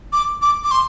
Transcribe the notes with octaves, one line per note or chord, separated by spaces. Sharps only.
D6
D6
D6
C6